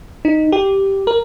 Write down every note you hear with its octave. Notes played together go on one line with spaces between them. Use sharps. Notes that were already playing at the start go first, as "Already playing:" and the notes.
D#4
G4
A#4